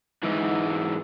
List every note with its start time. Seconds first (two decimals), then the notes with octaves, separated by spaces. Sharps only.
0.24 G#2 E3